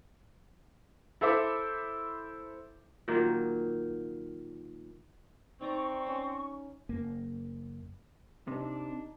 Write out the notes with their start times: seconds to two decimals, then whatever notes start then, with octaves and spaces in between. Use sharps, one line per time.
1.21 E4 A4 C5 E5 D6
3.08 A#2 D#3 F#3 A#3
5.61 C4 D#4 D5 A#5 C#6
6.06 C#4
6.89 F#1 A#3
8.48 C3 D4 D#4